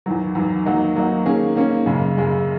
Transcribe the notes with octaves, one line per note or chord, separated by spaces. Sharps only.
E2 D#3 F#3
E2 D#3 F#3
D#3 F#3 A#3 D#4 F#4
D#3 F#3 A#3 D#4 F#4
D#3 A#3 C#4 G#4
D#3 A#3 C#4 G#4
F#2 C#3 G#3
F#2 C#3 G#3